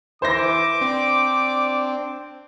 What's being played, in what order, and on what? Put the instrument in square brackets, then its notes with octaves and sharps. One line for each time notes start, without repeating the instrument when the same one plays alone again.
[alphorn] E3 [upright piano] C5 G6 A#6 [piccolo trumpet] D6
[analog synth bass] C4 [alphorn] D4